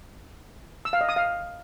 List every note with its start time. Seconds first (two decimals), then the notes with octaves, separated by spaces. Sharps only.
0.85 E6
0.93 F5
1.01 D#5
1.09 D#6
1.16 F5